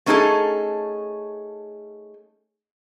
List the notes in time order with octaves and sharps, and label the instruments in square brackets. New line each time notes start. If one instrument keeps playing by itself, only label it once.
[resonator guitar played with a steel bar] A3 C#4 D#4 F4 G#4 A4